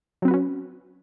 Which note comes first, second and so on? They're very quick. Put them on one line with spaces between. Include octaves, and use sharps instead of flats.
F#3 C4 B4 F#4 C#4